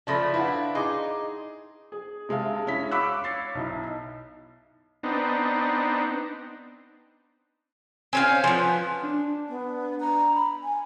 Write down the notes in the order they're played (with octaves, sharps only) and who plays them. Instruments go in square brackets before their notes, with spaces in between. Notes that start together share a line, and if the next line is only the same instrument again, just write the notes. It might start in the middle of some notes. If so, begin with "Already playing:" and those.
[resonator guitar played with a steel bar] C#3 F3 A3 [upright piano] D5 A#6 [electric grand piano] A5 B5
[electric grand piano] D4 E4 [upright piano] B4 F5 F#5
[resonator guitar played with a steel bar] D#4 [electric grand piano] G#4 [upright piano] C6 D6
[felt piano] G#4
C3 G#3 E5 F5 A5
G#3 C#4 E4 B6
F5 B5 C#6 D6 E6 F#6
C#5 A6 C7
B1 D#4 E4
[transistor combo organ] B3 C4 D4 D#4
[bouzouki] C4 C#4 F5 [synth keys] G#5
[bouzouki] F3 B3
[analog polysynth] D4
[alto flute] B3
A#5
B5
G#5